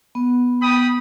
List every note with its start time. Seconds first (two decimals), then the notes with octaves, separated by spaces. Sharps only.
0.15 B3
0.62 G5 B5 D#6